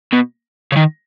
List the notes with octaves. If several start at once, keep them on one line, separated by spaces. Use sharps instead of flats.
B2
C#3
D#3